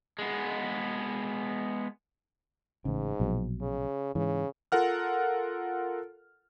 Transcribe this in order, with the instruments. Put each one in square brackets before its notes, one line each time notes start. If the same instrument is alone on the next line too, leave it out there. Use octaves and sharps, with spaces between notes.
[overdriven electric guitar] G#3 B3
[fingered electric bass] A1 C#3 [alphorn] G#2
[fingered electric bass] A#1 B2 F#3
[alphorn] C#3
[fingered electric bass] G#2 E3 [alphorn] C#3
[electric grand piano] F4 A4 A#4 F#5 F6